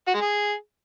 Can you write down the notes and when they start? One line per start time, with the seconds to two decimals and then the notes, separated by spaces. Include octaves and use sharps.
0.07 F#4
0.14 G#3
0.21 G#4